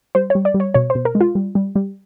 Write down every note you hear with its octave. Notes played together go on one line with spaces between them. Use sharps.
G3 C5
G3 C#5
D5
G3
C#5
B2 C#5
C5
B2
A#4
G#3
F4
G3
G3
G3